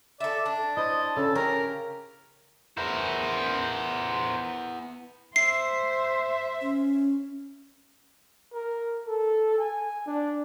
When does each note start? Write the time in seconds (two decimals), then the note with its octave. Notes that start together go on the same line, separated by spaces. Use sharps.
0.20 A4 D5 E5
0.46 D4 A5
0.77 E4 C5 D#5
1.16 C#3 A4
1.35 C#4 G4 A#4 A#5
2.77 B3 E4 A#4 C5
5.36 C5 E5 C7
6.61 C#4
8.53 A#4
9.06 A4
9.58 G#5
10.06 D4